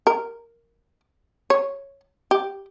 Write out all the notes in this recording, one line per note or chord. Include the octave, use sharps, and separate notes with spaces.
A#4
C#5
G4